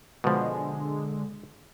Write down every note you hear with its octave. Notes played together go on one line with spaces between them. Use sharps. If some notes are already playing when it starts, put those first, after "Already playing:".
B2 D3 F3 G#3